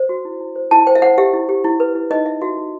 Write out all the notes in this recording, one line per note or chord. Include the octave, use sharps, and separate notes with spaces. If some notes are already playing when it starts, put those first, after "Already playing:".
Already playing: C5
F#4
E4
E4
C5
E4 A5
C5 G5
E5
C5 F#5
G4 E5
E4
G4
E4
B4
E4
D#4 D#5
D#4 E5
F#4 E5
D#4